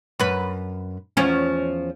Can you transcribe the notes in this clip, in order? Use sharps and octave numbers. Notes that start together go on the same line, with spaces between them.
F#2 B4
E2 F3 C#4